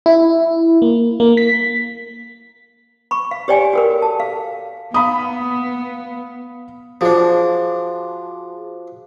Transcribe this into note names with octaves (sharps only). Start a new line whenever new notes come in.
E4
A#3
A#3
B6
B5 C#6
F5
G4 C#5 D5 G5 G#5
F#4 A4 A#4
A5
F5
B3 F5 B5 D#6
F3 D4 F#4 G#4 C5